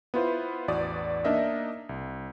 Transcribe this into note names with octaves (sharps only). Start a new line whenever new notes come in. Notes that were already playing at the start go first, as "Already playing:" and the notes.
B3 E4 F4 B4 C5
A1 E2 F#4 D5 D#6
A#3 D4 D#4 A#4 D#5 E5
C2